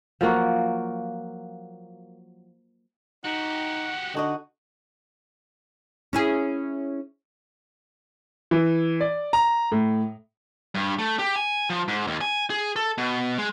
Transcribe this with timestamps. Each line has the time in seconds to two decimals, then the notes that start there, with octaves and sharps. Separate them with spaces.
0.21 F3 F#3 A#3 F#4
3.24 D#4 F#4 G4 F#5
4.15 D3 D#4 F#4 D#5
6.13 C#4 E4 G#4
8.51 E3
9.00 D5
9.33 A#5
9.72 A2
10.75 G2
10.99 A3
11.19 G4
11.36 G#5
11.70 F3
11.88 G#2
12.07 D#2
12.21 G#5
12.50 G#4
12.76 A4
12.98 B2
13.38 G#3